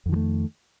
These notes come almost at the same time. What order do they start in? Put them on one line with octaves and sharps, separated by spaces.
F2 D#3 F3 A3